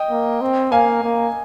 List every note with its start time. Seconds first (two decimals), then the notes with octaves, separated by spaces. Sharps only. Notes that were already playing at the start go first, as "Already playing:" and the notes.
Already playing: D#5 G5
0.11 A#3
0.42 C4
0.72 A#3 F5 G#5
1.03 A#3